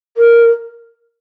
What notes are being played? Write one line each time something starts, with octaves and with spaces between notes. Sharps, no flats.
A#4